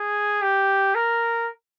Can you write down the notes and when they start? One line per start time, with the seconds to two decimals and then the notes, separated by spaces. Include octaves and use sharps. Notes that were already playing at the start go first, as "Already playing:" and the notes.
Already playing: G#4
0.42 G4
0.95 A#4